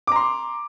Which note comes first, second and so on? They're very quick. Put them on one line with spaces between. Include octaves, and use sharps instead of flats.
D6 A#5 C6